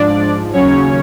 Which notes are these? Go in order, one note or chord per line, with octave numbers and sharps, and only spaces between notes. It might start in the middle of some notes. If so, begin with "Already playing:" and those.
Already playing: G#2 F3 D4 D5
D#2 C#3 F#3 C#4 C#5